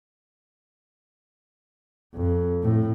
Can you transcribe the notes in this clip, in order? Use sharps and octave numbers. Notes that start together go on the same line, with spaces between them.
F2
A2